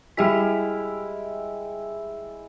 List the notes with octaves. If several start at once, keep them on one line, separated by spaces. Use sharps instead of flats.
G3 G#3 E4 G4 G5 B6